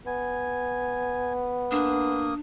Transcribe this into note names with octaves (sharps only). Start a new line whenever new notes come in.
B3 G#5
A#3 D4 D#6